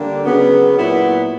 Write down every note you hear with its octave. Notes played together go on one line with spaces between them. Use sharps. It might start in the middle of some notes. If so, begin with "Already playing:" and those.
Already playing: D3 G3 A#3 D4
C#3 F#3 B3
A#2 F#3 B3 E4